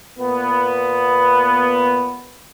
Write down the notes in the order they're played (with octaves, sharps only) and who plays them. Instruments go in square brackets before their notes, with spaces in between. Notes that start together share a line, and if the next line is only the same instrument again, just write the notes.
[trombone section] A#2 B3